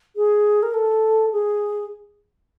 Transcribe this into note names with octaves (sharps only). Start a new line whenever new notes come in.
G#4
A#4
A4
G#4